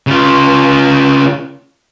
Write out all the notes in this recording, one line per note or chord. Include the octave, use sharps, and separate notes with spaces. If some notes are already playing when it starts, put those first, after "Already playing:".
C#3 F4